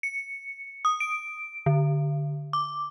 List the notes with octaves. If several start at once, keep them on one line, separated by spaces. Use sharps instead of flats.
C#7
D#6
D7
D3
D6